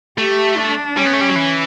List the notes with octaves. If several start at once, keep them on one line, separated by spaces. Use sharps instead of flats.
A3 G4
D4
G3 C#4
B3
A3
G3
F#3
E3